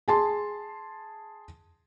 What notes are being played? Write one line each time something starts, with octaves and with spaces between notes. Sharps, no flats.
G#4 A5 C6